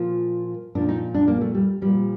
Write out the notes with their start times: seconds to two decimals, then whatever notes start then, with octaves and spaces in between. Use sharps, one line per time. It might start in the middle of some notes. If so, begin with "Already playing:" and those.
Already playing: A#2 F3 F4
0.75 A#2 F3 D4
0.89 D#4
1.14 D4
1.28 A#3
1.41 A3
1.55 G3
1.81 A#2 F3 G3